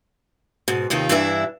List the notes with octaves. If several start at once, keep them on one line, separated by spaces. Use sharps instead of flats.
G#2 B2
D#2 C3 D#3 F4
G2 E3 D4 E4 A4 E5